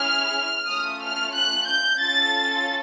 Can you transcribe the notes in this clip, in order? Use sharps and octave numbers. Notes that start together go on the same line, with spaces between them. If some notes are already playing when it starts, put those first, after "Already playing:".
Already playing: C#4 E4 G#4 F6
A3 C#4 F4 D#6
F6
F#6
G6
C#4 F4 A4 A6